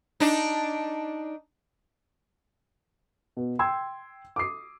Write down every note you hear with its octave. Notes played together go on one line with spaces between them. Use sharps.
D4 D#4
B2
G5 C6 E6 G#6
D6 D#6 C7